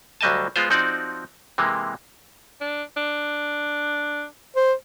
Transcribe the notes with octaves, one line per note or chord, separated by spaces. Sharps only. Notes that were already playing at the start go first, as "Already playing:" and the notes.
D2 F#3 G3 D#5 G#5 A5
G#3 B3 F4 C5
F3 C4 D#4 F#4 D5
C3 E3 G#3 A#3
D4
D4
C5